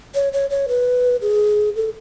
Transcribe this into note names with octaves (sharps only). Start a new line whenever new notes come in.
C#5
C#5
C#5
B4
G#4
A4